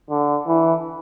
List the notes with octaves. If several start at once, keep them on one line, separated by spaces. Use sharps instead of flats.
D3
E3